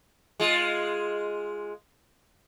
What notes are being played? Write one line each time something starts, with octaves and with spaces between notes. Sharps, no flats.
G#3 F4